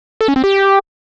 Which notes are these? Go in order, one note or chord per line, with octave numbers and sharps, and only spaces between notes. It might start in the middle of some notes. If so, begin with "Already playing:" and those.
A4
C#4
C4
G4